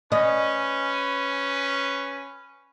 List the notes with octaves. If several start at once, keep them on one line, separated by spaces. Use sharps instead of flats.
C#4 B4 D#5